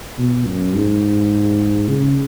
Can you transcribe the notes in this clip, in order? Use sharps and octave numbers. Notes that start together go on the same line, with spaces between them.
B2
F#2
G#2
C#3